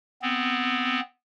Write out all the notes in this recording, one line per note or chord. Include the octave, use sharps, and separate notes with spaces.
B3 C4